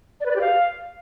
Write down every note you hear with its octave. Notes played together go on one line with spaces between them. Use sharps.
D5
B4
D5
G4
F5